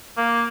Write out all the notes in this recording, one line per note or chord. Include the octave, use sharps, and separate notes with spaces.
A#3